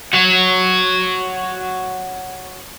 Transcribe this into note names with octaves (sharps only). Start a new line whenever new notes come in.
F#4 C#5